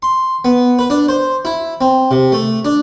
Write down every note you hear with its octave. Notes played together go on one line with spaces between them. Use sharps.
C6
B3
B4
D4
C5
E4
C4
C3
A3
D4